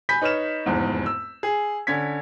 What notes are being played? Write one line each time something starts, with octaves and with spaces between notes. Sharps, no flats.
G#5 B5 G6 B6
D#4 B4 C#5 F6 E7
F1 E2 G#2
E6
G#4
D3 C#4 G#6 B6